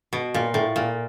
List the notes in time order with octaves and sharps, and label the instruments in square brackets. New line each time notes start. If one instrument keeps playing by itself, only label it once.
[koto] B2
A#2
A2
A#2